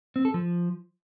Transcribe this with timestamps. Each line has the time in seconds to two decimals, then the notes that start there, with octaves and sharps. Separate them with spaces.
0.16 C4
0.25 A4
0.34 F3